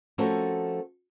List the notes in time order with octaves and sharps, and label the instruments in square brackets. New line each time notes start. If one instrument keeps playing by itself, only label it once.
[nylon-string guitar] F3 A3 C4 C#4 F#4 A#4